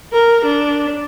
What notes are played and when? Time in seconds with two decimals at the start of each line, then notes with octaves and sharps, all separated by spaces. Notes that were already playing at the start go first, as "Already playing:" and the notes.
0.12 A#4
0.45 D4